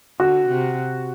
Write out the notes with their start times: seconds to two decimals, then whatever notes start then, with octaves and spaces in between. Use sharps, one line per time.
0.19 D3 F#4
0.48 C3